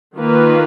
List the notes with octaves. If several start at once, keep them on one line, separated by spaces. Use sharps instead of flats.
D#3 A#3 F4 B4